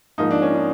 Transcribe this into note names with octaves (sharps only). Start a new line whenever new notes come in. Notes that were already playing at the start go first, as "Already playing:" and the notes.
G#2 F3 A#3 D#4
D4
C#4
D4